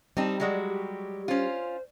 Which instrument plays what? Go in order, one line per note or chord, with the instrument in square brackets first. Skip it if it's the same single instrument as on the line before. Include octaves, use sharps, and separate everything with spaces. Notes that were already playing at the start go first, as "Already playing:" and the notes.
[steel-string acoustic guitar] G3 [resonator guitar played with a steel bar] C4 D#4 [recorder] A5
[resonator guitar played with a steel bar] F#3 G#3 F#4 [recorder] D5
[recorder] G4
[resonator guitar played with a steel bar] C#4 F4 [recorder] C5